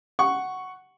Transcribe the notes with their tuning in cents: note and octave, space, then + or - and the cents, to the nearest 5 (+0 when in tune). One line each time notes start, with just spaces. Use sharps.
F#5 +5 C#6 +0